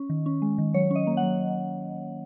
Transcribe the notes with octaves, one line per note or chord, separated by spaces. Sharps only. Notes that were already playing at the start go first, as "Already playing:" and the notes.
Already playing: C#4
D#3
C#4
G#3
D#3
F#3 C#5
C#4
D#5
A#3
F#5
F#3